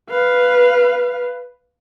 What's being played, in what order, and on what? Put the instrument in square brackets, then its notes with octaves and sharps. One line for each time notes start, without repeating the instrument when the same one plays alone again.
[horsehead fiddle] B4 F5